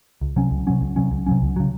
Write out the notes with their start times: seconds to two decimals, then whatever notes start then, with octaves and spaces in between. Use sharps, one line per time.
0.21 C#2
0.36 C3 F#3 C#4
0.51 C#2
0.67 C3 F#3 C#4
0.81 C#2
0.96 C3 F#3 C#4
1.11 C#2
1.26 C3 F#3 C#4
1.42 C#2
1.56 C#3 F#3